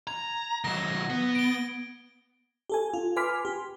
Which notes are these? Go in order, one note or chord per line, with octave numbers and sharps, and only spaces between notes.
A#5 G#6
D#3 F#3 A#6
B3
D7 G7
G4 A4 G#5
F4
B4 G#5 C6 D6 F6 B6
G4